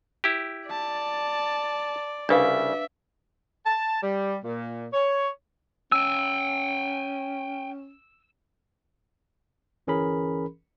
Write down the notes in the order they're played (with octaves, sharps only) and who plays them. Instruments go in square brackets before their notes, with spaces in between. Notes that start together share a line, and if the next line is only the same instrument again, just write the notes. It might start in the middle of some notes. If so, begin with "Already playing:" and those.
[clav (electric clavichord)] E4 G4
[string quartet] D5 [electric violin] A5
[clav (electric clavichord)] C2 C#3 [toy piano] D4 B4 F5 [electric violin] E5
[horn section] A5
G3
A#2
C#5
[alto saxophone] C#4 [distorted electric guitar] G5 G#5 [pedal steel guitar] E6
[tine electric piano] G1 E3 C#4 G#4 A#4 B5